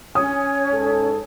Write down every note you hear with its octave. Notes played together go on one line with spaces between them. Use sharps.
C#4 C#5 G#5 D#6
G#2 A4